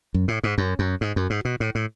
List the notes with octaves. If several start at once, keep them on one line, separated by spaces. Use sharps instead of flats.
F#2
A2
G#2
F#2
F#2
G#2
F#2
G#2
B2
A2
A2